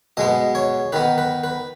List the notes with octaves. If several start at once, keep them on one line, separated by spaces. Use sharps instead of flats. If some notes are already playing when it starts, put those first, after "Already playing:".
B2 G#3 B3 D#5
C#5
D#3 B3 B4
B4
B4